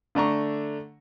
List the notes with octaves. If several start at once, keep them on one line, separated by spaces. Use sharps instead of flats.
D3 A3 D4 A#5 C#6